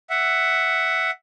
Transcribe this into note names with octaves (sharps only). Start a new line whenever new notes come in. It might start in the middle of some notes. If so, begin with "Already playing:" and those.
E5 F#5